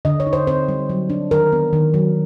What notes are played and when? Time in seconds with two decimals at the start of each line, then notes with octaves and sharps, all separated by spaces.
0.05 D3 D#5
0.20 C#5
0.27 D#4
0.33 C5
0.47 C4 C5
0.69 G3
0.90 F#3
1.10 D4
1.31 D#3 A#4
1.52 B3
1.73 D#3
1.94 F#3